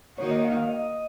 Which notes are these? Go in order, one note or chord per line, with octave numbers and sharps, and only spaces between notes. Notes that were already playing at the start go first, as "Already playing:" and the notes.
D#3 A#3 D#4 F#4 C#5
D#5
F5
F5
D#5